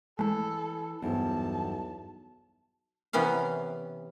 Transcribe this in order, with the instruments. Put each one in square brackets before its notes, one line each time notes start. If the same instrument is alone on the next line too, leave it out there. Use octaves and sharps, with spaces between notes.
[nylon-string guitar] E3 [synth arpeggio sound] G#3 A3 [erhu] A4
[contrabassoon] B1 [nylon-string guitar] E2 G2 C5 [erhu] A5
[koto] C3 E3 B3 C#4 F5